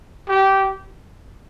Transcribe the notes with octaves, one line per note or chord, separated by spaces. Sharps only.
G4